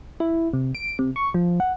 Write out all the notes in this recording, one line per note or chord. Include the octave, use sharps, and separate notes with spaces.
E4
C3
D7
C3
C#6
F3
F#5